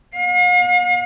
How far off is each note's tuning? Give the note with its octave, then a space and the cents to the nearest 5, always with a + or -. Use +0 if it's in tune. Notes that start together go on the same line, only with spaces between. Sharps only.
F5 +45